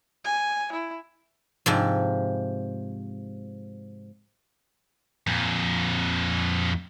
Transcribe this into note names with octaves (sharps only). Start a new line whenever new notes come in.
G#5
E4
G#2 C3 F3
F2 A#2